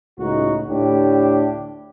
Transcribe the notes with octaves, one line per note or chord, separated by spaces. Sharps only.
C#2 A2 D#4 F#4
D2 A2 D4 G4